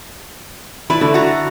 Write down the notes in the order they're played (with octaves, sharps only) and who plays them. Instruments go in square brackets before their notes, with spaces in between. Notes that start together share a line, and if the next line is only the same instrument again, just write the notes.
[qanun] E4 B4 D5 [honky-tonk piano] B5
[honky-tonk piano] D3 [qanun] A3
[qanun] F#4 A#5